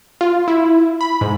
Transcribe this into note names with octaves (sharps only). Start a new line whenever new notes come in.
F4
E4
B5
G#2